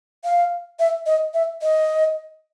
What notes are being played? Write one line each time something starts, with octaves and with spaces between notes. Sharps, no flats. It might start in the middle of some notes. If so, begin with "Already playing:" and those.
F5
E5
D#5
E5
D#5